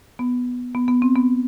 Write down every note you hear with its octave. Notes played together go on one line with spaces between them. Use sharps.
B3
B3
B3
C4
B3